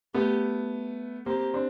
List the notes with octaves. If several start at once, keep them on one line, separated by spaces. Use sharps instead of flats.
A3 B3 G4
A#3 C4 G4
C4 D4